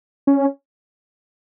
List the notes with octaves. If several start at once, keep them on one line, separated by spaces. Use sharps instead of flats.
C#4